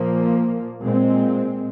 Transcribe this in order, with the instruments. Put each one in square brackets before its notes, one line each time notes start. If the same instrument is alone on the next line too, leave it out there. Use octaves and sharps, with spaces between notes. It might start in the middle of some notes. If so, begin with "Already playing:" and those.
Already playing: [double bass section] A#2 F3 A#3
A#2 G#3 C4